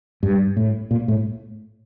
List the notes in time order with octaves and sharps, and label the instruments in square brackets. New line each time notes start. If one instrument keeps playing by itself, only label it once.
[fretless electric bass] G2
A2
A#2
A2